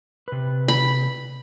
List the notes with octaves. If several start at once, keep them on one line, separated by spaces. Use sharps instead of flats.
C3 B4
B5